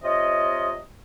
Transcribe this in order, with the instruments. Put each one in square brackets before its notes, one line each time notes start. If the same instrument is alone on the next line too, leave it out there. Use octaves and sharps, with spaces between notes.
[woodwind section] C3 F4 C#5 D#5